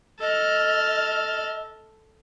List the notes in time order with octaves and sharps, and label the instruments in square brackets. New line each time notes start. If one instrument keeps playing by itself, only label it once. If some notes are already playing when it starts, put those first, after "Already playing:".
[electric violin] A4 F6 [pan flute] D#5